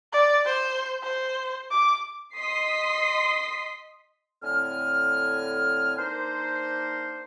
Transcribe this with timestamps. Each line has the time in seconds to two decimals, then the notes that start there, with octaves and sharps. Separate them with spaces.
0.13 D5
0.45 C5
1.03 C5
1.71 D6
2.36 D#5 C6 D#6 B6 C7
4.42 A2 D3 C4 G#5 F6
5.98 A#3 D4 D#4 A#4 C5